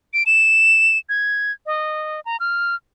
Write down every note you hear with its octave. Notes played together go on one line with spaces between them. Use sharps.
D7
E7
G#6
D#5
A#5
F6